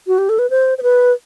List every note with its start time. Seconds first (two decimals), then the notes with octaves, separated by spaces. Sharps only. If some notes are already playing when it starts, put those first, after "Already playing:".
0.07 F#4
0.18 G4
0.29 A4
0.39 B4
0.50 C5
0.78 C5
0.83 B4